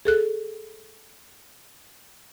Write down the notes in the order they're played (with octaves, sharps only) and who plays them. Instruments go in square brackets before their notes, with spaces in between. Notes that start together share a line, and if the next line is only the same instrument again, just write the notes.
[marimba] G#4 A4 F#6